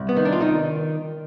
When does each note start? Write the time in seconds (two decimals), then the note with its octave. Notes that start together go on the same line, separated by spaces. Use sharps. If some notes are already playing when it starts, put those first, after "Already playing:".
Already playing: C2
0.09 B3
0.17 D#3
0.25 D4
0.32 F4
0.41 D#3 D#4